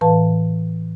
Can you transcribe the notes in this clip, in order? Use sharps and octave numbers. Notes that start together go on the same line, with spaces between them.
A2 E3 B4 F5 A5